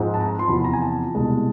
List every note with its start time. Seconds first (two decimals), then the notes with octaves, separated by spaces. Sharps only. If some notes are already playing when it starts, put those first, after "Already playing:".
Already playing: G#2 F3 G#3 C4
0.14 A5
0.21 A#5
0.28 A5
0.39 C6
0.48 E2 C3 F3 B5
0.60 B5
0.64 A#5
0.73 G#5
0.82 A5
1.15 C2 B2 G#3 A5